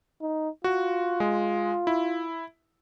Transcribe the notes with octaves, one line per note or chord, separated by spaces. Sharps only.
D#4
F4 F#4
G#3
E4